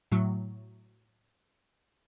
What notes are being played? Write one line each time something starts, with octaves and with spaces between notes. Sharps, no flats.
A2 F#3